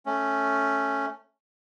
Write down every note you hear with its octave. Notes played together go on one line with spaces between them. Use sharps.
A3 C#4